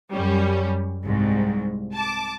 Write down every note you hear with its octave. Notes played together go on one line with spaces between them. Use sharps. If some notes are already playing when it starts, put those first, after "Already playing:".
F#2 G3 C#4
C2 G#2
A5 D6